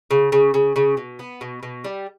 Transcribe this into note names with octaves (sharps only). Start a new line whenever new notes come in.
C#3
C#3
C#3
C#3
B2
B3
B2
B2
G3